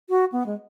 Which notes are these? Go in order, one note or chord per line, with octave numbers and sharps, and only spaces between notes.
F#4
B3
G#3